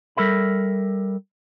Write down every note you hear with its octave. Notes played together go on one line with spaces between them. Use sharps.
G3 A4 A#4 E5 B5